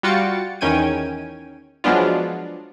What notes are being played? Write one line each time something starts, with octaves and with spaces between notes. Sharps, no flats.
G3 F4 F#4 G5 A6 C#7
E2 D#3 C#4 G5 G#6 D#7
F3 F#3 G#3 B3 D4 F4